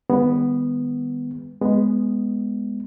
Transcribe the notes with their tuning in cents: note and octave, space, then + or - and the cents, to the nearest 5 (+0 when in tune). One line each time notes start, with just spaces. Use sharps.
D#3 +0 G#3 -45 B3 +0
G#3 +0 B3 +0